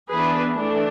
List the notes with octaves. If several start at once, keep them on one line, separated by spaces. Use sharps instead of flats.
E3 B3 D4 G#4 B4
E3 A3 D4